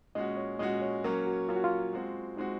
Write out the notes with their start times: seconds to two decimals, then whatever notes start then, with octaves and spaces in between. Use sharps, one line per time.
0.15 A#2 G#3 C#4 F#4 D#5
0.37 C#5
0.59 A#2 G#3 C#4 F#4 D#5
0.82 C#5
1.04 F#3 A#3 C#4 A#4
1.27 F#4
1.48 F#3 A#3 C#4 F4
1.56 F#4
1.64 F4
1.93 G#3 C4 F#4
2.37 G#3 C4 D#4 F#4